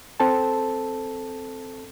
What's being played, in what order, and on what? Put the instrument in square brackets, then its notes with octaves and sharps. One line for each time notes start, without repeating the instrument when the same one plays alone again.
[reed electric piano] C4 A4 A5